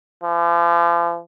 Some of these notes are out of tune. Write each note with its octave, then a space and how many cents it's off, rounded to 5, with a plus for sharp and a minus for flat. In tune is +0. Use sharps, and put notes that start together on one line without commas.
F3 -40